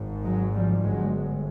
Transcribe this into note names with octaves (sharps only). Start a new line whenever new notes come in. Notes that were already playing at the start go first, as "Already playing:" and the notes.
Already playing: G#1 G#2
F#3 G#3
F3 G3
G1 G2 F#3 G#3